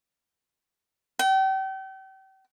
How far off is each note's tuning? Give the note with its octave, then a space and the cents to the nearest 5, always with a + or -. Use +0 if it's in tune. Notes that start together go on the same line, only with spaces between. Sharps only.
G5 -40